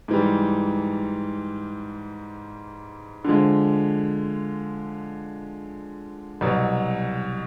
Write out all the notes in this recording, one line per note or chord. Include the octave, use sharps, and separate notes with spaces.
G#2 E3 G3
D3 F3 G#3
C2 B2 F#3